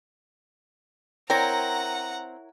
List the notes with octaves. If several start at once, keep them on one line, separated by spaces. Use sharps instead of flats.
C4 E4 A#4 C#5 F#5 G5 A#5 A#6